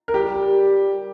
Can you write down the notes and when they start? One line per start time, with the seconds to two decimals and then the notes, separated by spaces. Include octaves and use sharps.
0.08 A#4
0.14 G3 G4